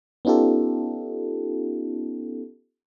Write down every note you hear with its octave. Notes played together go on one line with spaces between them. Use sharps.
B3 C#4 D#4 F4 G4 A4